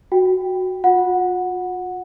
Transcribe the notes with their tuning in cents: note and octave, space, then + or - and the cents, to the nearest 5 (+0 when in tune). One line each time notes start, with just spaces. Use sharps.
F#4 +0 G5 +0
F4 +45 F#5 -10